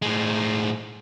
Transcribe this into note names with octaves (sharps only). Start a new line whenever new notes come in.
A2 G#3